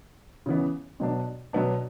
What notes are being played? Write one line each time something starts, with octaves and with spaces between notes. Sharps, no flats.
C#3 E3 B3
B2 F#3 B3 D4
B2 F#3 B3 D4